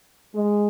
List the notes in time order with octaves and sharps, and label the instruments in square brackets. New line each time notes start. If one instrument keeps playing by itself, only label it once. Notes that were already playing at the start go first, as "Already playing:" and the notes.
[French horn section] G#3